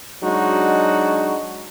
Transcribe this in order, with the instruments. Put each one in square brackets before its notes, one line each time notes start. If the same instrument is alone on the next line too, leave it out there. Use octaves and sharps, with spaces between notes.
[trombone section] F#3 G#3 D4 D#4 F#4